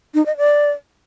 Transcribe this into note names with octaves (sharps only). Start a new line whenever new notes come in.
D#4
D#5
D5